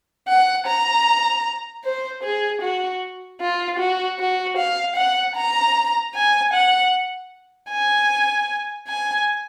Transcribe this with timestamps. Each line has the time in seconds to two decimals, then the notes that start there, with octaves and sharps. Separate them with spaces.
0.28 F#5
0.67 A#5
1.84 C5
2.23 G#4
2.62 F#4
3.41 F4
3.79 F#4
4.19 F#4
4.57 F5
4.96 F#5
5.36 A#5
6.14 G#5
6.53 F#5
7.70 G#5
8.88 G#5